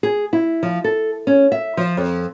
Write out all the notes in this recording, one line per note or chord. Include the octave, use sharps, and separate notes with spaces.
G#4
E4
F3
A4
C#4
E5
F3
F2